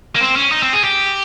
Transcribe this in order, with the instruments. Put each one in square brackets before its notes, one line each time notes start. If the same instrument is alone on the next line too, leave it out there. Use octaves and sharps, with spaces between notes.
[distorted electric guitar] A#3
C4
C#4
D#4
C4
G#4
G4